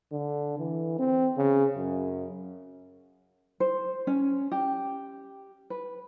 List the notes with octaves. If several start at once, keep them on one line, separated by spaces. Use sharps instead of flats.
D3
E3
C4
C#3
F#2
C5
C#4
G4
B4